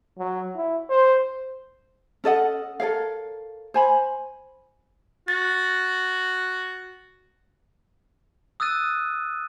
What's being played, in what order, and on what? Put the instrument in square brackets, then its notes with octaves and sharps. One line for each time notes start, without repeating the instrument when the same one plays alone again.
[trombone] F#3
E4
C5
[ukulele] C#4 A4 D#5 F#5
A4 A#4 C#5 F5
C5 G#5 B5
[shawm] F#4 [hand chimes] A6
[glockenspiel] D#6 E6 F#6 A6 D#7